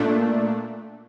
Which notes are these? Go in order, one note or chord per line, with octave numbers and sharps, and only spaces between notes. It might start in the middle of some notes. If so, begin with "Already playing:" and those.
Already playing: A#2 A3 D4